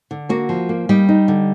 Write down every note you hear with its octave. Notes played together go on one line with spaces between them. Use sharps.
D3
A#3 F#4
F3
A#3
G3 D#4 G4
D#4
D3